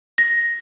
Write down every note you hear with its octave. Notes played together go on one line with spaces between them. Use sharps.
A#6